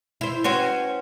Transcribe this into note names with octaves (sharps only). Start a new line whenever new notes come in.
E4 C5
C#4 F#4 B4 C5 F#5 G5